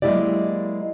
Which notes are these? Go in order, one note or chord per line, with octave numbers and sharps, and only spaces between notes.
F#3 G#3 A#3 E4 G4 D5